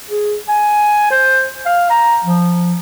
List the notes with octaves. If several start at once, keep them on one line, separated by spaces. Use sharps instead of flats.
G#4
G#5
C5
F5
A#5
F3